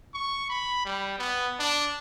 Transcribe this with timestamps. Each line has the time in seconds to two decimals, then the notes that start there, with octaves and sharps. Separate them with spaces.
0.14 C#6
0.50 B5
0.85 G3
1.18 B3
1.59 D4